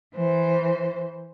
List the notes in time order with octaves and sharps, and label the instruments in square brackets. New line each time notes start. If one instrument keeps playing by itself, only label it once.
[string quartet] E3 C5